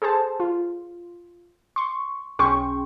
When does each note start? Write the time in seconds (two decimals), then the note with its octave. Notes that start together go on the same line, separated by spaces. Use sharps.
0.02 G#4 A4 C5 A5
0.40 F4
1.76 C6 C#6
2.39 B1 C#4 G#4 G5 C6 C#6